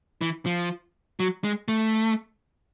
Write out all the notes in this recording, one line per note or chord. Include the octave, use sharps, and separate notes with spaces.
E3
F3
F#3
G#3
A3